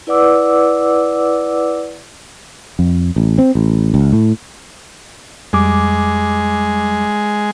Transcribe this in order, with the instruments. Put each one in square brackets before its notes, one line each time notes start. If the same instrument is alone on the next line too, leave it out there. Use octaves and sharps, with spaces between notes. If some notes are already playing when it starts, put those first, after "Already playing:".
[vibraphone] E4 B4 D5 F#5 D6 E6
[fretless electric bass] F2
A1
C4
A1
C#2
A2
[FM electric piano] F2 G3 D6 [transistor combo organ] G#3